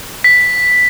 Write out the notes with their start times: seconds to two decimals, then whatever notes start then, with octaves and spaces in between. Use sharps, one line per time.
0.24 B6